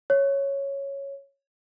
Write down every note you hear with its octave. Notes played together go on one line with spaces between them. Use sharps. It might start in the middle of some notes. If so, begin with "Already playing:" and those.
C#5